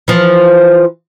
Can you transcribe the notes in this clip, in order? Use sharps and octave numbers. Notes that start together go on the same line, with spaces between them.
E3 F3